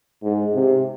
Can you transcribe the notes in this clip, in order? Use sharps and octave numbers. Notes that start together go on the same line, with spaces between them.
G#2
C3